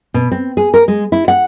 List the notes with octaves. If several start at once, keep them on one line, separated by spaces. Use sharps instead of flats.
B2
C4
G#4
A#4
G#3
E4
F#5